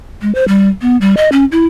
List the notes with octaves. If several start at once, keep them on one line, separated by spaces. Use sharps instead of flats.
G#3
C5
G3
B3
G3
D#5
C#4
E4